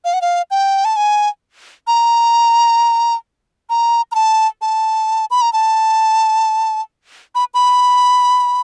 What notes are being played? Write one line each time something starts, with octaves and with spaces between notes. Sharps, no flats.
F5
F#5
F5
G5
A5
G#5
A#5
A#5
A#5
A5
A5
B5
A#5
A5
B5
B5